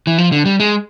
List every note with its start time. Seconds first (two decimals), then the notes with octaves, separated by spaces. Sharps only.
0.07 E3
0.18 F3
0.32 D3
0.46 G3
0.60 G#3